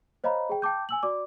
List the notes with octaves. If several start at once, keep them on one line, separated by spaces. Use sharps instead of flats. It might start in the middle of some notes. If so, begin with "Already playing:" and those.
C5 C#5 D#5 F5 A#5 B5
G#4 G5
G5 A5 D6 G6
G#5 E6 F#7
F#4 D5 D6